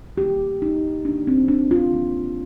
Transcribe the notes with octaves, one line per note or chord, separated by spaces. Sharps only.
D#3 A#3 G4
D#4
D#3 A#3 D4
C4
D4
F4
D#3 A#3